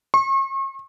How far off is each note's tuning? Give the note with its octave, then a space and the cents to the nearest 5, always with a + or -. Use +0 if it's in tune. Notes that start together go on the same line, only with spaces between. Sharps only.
C#6 -40